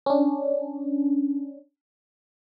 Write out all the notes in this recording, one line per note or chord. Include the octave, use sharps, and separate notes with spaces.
C#4 D4